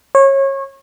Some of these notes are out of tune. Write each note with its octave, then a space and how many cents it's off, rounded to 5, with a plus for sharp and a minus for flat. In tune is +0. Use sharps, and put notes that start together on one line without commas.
C#5 -25